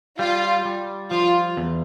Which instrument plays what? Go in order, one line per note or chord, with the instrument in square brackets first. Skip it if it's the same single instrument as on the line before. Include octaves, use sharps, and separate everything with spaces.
[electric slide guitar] G3 [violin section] F4
[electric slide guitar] G3
[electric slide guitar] F3 [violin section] F4
[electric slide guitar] E2